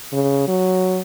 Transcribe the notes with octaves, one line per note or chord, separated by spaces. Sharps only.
C#3
F#3